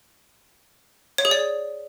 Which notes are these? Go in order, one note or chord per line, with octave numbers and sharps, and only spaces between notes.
C#5
G#4
D5